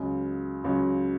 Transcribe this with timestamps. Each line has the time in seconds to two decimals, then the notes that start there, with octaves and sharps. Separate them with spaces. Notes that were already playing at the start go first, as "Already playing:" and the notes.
Already playing: C#2 C#3 F#3
0.64 C#2 C#3 F#3